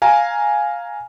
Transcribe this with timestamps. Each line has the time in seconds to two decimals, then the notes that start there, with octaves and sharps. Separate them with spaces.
0.02 F5 G#5 A#5